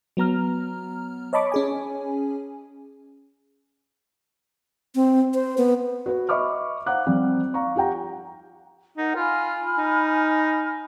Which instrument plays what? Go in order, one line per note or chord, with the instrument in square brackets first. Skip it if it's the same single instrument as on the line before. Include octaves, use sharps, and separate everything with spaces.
[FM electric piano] F#3 B3 A#5 F6
C#5 D#5 A5 B5 C#6 D6
C#4 G#4 G#5
[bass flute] C4
C5
B3
[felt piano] F#4 B4
D#5 E5 B5 C#6 D6 F6
C5 F5 F#5 A#5 D6 F#6
F3 G3 C4
F5 A#5 C#6
F4 G4 F#5 G5 A#5
[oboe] D#4 [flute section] A#4 F#5
[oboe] F4 [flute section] G#5 B5 F6
[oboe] D#4